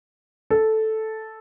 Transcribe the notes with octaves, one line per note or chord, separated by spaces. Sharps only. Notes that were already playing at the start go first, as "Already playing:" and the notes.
A4